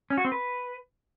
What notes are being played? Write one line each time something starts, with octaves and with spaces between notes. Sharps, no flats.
C#4
F#4
C4
B4